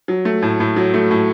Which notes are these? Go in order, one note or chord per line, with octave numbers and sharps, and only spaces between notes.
F#3
A3
A2
A2
F#3
A3
A2